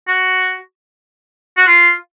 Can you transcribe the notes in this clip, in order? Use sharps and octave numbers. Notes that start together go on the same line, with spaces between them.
F#4
F#4
F4